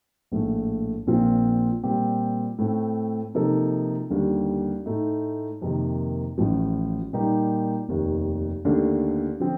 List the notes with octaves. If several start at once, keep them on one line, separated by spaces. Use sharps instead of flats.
A#1 A2 A3
A#1 A#2 F3 C4 F4
A#2 G3 C4 G4
A2 A3 C4
C3 F3 A#3 D#4 A4
D#2 D3 G3
A2 A3 D#4
F2 C3 D#3 A#3 D#4
A1 A2 F3
A#2 G3 A#3 D#4 G4
F1 D#2 D#3
D#2 D3 A3 D4
D3 F3 C4